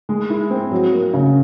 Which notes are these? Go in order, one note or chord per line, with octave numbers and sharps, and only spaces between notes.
G#3
E4
C4
F#3
A#3
C#3